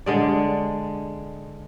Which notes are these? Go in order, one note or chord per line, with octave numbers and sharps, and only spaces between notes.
D3 G#3 D5